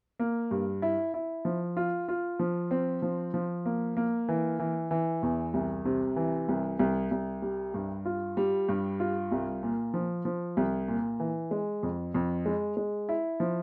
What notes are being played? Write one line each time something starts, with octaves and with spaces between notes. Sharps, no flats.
A#3
G2
E4
E4
F3
F4
F4
F3
C4
F3
F3
A#3
A#3
E3
E3
E3
E2
C2
C3
E3
C2
C2
C2
G3
G2
F4
G3
G2
F4
C2
A#2
F3
F3
C2
A#2
E3
G#3
F2
F2
G#3
G#3
E4
F3